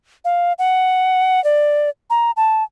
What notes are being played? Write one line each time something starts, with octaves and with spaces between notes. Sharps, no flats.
F5
F#5
D5
A#5
A5